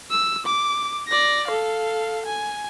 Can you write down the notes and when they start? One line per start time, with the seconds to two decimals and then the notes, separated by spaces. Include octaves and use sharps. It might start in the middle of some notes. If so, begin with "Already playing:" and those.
0.11 E6
0.47 D6
1.09 D5 A#6
1.48 A4 F5
2.26 G#5